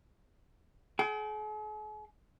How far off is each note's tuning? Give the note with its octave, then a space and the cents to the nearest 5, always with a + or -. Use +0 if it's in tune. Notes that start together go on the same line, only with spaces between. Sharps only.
G#4 +45 G5 -25